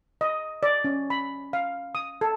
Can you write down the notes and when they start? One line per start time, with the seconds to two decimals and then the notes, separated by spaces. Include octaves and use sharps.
0.21 D#5
0.63 D5
0.84 C#4
1.10 B5
1.53 F5
1.95 D#6
2.21 A4